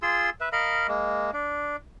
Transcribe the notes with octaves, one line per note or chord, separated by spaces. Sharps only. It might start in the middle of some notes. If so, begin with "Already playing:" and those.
F4 G#4 C6 E6
B4 E5
A#4 D#5 F5 B5
G#3 A#3
D4